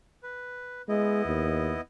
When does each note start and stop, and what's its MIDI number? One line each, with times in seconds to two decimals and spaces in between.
0.23 0.82 71
0.89 1.22 56
0.89 1.81 59
0.89 1.81 64
0.89 1.81 75
1.26 1.76 39